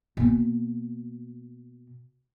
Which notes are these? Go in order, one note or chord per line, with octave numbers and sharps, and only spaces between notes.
B2 A#3